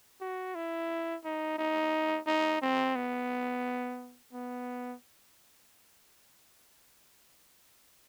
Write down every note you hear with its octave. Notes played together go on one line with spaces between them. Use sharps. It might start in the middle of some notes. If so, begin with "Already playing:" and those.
F#4
E4
D#4
D#4
D#4
C4
B3
B3